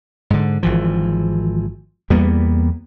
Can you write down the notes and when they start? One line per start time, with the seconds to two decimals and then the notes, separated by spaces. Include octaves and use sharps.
0.30 G#2 D3
0.63 G#1 E3 F3
2.10 E2 G3 A#3 B3